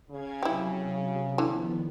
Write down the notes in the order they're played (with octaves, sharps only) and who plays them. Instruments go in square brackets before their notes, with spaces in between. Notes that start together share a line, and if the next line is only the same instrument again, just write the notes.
[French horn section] C#3 [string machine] F5 G#6
[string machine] C3 F#3 [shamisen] E4 G4
[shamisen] D3 [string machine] D#3 F3 B3 [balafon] E4